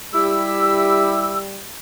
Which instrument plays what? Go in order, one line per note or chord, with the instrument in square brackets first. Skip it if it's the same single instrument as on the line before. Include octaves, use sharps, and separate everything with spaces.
[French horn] G3 [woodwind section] E4 G4 E6